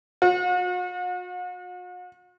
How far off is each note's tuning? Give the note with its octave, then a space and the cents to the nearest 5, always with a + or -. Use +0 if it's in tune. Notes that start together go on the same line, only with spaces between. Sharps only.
F#4 -40